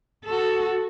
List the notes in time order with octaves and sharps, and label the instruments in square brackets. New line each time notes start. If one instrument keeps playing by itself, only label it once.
[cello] F#4 A4